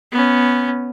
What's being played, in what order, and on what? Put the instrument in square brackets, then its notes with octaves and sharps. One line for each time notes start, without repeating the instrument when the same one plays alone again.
[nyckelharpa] B3 C#4